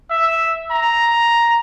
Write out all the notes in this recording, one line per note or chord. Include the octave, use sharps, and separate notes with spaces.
E5
A#5